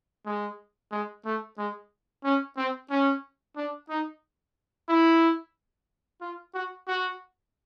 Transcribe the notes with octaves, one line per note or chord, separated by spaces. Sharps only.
G#3
G#3
A3
G#3
C#4
C4
C#4
D4
D#4
E4
F4
F#4
F#4